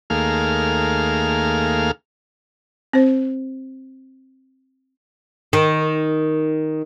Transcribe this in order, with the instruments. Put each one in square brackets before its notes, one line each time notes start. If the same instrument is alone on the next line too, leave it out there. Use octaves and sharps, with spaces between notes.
[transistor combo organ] D#2 A3 A#3 G#4 F5 F6
[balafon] C4 C5
[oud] D#3